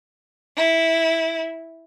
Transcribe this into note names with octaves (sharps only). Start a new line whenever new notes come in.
E4